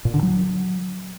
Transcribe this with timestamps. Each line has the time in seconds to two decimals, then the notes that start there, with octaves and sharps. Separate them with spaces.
0.05 A#2
0.14 D3
0.23 F#3